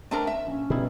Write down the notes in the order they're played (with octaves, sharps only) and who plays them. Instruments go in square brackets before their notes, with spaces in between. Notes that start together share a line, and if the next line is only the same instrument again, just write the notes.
[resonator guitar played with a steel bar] A3 D4 A#4 [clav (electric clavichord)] C4 B4
[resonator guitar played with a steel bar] E5
[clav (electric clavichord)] A#1 [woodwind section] C#4
[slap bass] B2 [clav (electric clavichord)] G3 D#4 E4